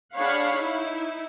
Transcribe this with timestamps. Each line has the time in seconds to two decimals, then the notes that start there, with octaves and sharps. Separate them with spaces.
0.15 D4 G#4 C#5 F5 F#5 B5
0.52 D#4 E4